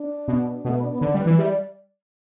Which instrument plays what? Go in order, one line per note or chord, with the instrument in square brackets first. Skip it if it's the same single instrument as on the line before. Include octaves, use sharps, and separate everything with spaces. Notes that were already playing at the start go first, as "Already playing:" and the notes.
Already playing: [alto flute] D4
[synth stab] B2
[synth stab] B2 [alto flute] A3
[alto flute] B3
D4
B3
[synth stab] D3 [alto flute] D4
[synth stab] G3
[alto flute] B4
[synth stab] E3
[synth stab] G3 [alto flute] E5
[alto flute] D5